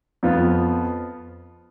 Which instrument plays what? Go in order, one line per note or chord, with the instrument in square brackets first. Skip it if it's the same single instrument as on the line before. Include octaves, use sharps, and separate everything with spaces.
[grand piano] F2 F3 B3 F4